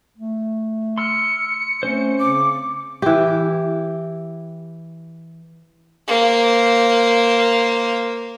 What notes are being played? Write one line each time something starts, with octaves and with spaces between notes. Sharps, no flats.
A3
C6 E6 F6 C#7
A3 C4 C#4 C5
C#3 D6
E3 G4
A#3 C5